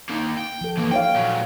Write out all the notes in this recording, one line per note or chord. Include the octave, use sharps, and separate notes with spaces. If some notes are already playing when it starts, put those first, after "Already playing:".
A#3 D#4
G5
F3 A4
E3 A#3
D#4 C#5 F5 G5
A#2 F#3